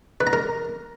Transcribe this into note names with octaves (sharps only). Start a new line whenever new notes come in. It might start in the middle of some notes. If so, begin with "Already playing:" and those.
B4
A#5
A#4